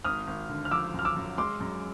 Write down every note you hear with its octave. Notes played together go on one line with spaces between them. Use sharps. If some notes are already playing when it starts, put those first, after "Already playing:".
G#1 D#6 F6
G#1
D3
F6
F3 D6 E6
F#2 F6
D6 E6
F#2
G#3 C6 D6
F#2